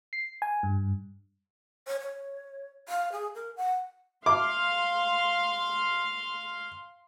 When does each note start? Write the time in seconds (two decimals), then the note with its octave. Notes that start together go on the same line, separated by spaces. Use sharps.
0.13 C7
0.42 G#5
0.63 G2
1.87 C#5
2.00 C#5
2.89 F5
3.12 G#4
3.35 A#4
3.57 F#5
4.26 F5 C6 D6